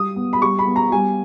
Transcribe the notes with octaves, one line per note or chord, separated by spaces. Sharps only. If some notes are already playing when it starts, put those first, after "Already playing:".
Already playing: G3 D#6
B3
B5
G3 C#6
B5
B3
A#5
G3 G#5